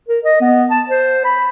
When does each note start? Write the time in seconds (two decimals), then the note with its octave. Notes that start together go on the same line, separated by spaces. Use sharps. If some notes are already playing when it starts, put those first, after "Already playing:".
0.08 A#4
0.25 D#5
0.41 B3
0.71 A5
0.89 C5
1.24 B5